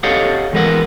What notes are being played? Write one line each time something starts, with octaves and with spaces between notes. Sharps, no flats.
G4 A4 C#5 D#5 F5 F#5
E3 G#3 B3 A#4 F#5